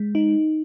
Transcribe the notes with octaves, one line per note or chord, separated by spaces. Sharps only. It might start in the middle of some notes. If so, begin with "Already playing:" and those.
Already playing: G#3
D#4